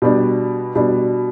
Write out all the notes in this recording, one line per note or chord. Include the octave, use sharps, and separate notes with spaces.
B2 G3 D4
B2 G3 D4